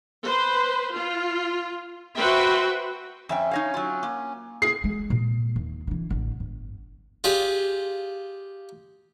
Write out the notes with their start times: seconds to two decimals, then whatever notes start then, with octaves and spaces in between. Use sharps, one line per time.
0.26 B4 C5
0.93 F4
2.16 F#4 B4 C5 E5 G5
3.29 F2 C#4 E5 G5
3.51 D#4 C#5 F5
3.74 F#3 F4
4.03 A#3
4.62 G#4 C7
4.84 G#3
5.10 A#2
5.56 D#2
5.87 D3 E3
6.10 A1 D3
6.40 G1
7.24 F4 G4 G#4 D5